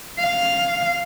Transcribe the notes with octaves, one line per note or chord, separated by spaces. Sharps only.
F5